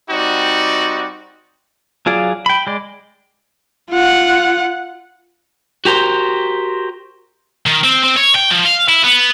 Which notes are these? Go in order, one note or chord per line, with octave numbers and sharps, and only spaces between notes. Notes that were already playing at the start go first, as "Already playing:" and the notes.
G3 C4 D#4 F#4 D5
F#3 F4 G#4 D5
G5 B5
G#3 D5
F4 F#5
F#4 G4 A#4 C5
D#3
C4
C4
C#5
G5
F3
F5
E4
B3